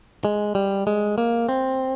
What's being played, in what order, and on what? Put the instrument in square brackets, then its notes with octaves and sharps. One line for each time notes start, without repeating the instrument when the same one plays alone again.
[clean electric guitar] G#3
G3
G#3
A#3
C4